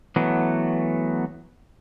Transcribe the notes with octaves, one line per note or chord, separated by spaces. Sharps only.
E3 F#3 A3 B3